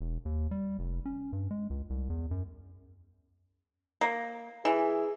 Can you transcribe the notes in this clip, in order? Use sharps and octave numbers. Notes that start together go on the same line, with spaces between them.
E1
D#2
G3
F1
C#4
G2
G#3
C#2
C2
E2
F#2
A#3
E3 G#4